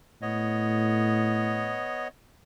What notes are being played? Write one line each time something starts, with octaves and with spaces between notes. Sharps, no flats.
A2 B3 C#5 D#5